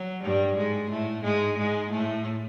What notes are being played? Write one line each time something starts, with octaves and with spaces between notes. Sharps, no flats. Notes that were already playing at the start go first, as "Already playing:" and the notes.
Already playing: F#3
G2 G3
G#2 G#3
A2 A3
G#2 G#3
G#2 G#3
A2 A3